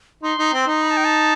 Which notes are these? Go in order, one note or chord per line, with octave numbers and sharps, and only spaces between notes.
D#4 C6
D#4
C4
D#4
B5
A5
G5
A5